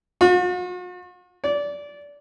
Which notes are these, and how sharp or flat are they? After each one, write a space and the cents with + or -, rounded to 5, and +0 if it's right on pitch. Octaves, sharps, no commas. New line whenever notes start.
F#4 -45
D5 -20